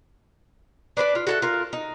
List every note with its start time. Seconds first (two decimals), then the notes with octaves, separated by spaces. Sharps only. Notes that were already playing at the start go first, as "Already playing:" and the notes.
0.97 D4 B4 C5 D5
1.15 F4
1.27 F#4 A4 E5
1.42 F4 A#4
1.73 D#4